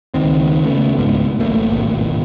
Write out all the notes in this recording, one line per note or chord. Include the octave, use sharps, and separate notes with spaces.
C#2 D#3 C4
C#3 A3 B3
C#2 G#2 B2
D1 A1 A3 A#3
D1 G#1 B2